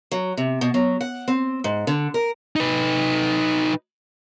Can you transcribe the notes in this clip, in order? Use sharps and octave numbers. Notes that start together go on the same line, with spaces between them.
F#3
C3
B2
F#3
F#5
C4
G#2
D3
A#4
D#4 B4